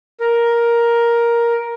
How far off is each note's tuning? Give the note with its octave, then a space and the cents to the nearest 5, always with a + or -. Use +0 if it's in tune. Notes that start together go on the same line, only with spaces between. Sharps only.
A#4 +10